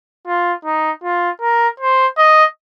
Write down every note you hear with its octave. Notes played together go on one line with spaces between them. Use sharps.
F4
D#4
F4
A#4
C5
D#5